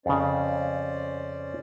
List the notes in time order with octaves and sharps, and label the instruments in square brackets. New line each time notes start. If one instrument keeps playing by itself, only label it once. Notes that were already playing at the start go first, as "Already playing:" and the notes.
[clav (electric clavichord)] F2 C#3 [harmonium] C#4 C5 D5